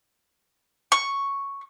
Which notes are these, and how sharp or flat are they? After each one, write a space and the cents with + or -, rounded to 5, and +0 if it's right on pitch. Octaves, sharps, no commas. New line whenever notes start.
C#6 +0